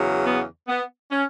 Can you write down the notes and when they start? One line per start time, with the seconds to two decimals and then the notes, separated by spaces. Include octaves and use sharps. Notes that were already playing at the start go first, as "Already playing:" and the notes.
Already playing: E2 C#3 F#3
0.26 B3
0.68 B3
1.11 C#4